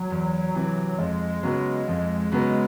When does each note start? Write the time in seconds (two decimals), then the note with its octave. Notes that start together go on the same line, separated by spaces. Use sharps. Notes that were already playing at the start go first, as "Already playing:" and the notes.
Already playing: F#3
0.10 E2
0.54 C3 E3
0.98 F2 G#3
1.43 C#3 F#3 B3
1.88 F2
2.32 C#3 F#3 B3